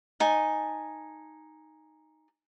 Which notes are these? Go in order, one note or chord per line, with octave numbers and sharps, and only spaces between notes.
D#4 G#5 A5